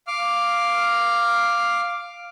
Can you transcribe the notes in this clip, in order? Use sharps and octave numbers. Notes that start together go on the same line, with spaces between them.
F5 D6 F6